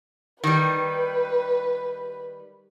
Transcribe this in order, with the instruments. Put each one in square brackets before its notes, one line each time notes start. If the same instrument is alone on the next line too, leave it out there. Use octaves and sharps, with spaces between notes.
[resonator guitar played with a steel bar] D#3 G3 [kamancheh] B4